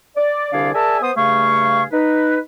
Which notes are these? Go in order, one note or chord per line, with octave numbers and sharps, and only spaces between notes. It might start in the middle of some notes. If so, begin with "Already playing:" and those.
D5
C2 D3 D4 G#4 D5 F5
G#4 A#4 D5 E5 G#5 A5
B3 C5 D#6
G2 C#3 A3 G#4 F5 C#6
D#4 B4